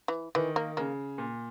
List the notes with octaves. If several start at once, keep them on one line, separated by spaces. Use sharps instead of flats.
E3
D#3 E3
A#3
C#3 A#3
A#2